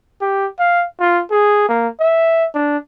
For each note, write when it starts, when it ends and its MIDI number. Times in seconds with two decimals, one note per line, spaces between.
0.21 0.47 67
0.59 0.86 77
1.00 1.22 65
1.31 1.67 68
1.69 1.88 58
2.00 2.48 76
2.55 2.77 62